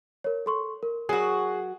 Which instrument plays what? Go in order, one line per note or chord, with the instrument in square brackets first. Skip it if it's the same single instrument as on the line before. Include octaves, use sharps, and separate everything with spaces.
[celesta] A#4 C#5
A4 C6 C#6
A#4
[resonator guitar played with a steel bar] F#3 F#4 [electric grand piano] G#4